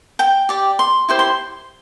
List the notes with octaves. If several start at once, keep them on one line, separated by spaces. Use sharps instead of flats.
G5
G4 D5
C6
E4 G4 C5 C6
C6